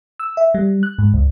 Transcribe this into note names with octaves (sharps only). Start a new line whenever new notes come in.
E6
E5
G3
F#6
G#2
C#2